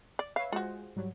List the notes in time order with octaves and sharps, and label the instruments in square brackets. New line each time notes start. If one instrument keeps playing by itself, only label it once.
[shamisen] D5
[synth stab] B4 C#5 E5 [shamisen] F5
[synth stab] G#3 G#4 C5 [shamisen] F4 F#4
[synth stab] G#2 F#3 G3